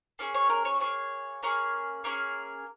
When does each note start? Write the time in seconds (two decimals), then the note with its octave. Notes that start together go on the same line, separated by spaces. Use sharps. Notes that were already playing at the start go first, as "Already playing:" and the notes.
0.19 A#3 C#4 G#4
0.34 C#5
0.50 A#4
0.65 C#5
0.80 A#3 C#4 G#4 C#5
1.43 A#3 C#4 G#4 A#4
2.04 A#3 C#4 G#4 A#4